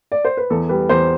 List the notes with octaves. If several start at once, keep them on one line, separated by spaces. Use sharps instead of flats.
D5
C5
B4
E2 A4
G3 B4
E2 C5